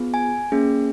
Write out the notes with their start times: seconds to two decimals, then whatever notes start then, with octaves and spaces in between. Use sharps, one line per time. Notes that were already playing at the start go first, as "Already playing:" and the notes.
Already playing: B3 F4 G#4
0.14 G#5
0.52 A#3 C#4 G#4